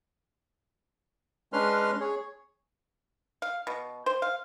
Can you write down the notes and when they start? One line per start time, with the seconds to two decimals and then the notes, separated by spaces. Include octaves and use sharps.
1.53 G#3 C#4 D4 B4 C6 F6
2.00 G#4 C#5
3.42 F5
3.67 B2
4.06 C5
4.22 F5